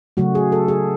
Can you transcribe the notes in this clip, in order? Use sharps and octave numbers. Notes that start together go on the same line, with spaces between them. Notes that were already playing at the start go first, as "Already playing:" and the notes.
C#3 F#3 A3 F#4
G#4
A4
G#4